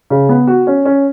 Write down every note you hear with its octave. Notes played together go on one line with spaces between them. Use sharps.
C#3
B3
F#4
C#4
C#4